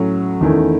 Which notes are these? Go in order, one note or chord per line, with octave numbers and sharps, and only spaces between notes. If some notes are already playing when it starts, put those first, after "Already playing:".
Already playing: A2 F#3 C#4
E2 D#3 A3 C#4 E4